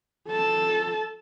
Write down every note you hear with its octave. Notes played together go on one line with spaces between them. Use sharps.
A4 A5